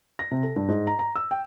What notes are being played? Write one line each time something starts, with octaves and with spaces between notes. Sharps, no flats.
A#6
C3
A4
G2
G#2
A#5
A#5
E6
G5